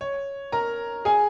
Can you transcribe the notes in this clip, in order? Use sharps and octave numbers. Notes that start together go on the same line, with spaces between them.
C#5
A#4 A#5
G#4 G#5